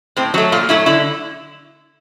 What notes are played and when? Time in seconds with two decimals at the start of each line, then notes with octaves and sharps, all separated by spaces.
0.17 A2 C4
0.34 F#3 C4
0.38 A3
0.52 A#2 F4
0.69 F#3 A3 E4
0.86 D3 E4